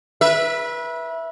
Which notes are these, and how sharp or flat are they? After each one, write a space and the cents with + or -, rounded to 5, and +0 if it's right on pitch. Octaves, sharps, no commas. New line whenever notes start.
B4 -30 E5 +0